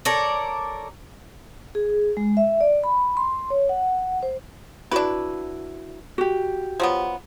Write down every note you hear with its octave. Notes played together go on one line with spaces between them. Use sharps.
A4 A#4 C#5 D5
G#4
G#3
E5
D5
B5
C6
C#5
F#5
C5
D4 E4 F#4 B4
F#4 G4
F3 F#3 B3